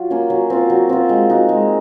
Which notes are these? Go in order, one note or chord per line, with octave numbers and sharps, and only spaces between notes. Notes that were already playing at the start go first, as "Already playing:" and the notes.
Already playing: F#3 F4
A#3 C#4
F#3
C4 F4
F#3
C4 F4
G#3
D#4 F#4
G#3